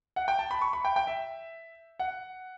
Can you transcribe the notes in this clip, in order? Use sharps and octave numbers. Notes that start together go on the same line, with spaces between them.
F#5
G5
A5
B5
C#6
B5
G5
G5
E5
F#5